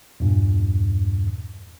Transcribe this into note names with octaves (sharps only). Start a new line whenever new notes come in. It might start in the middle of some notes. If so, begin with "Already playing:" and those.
E2 G2 A#2